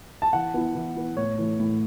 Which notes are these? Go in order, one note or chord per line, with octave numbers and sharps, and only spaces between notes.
A5
E3 F#5
B3 E4
E3
B3 E4
A2 C#5
E3 A3
A2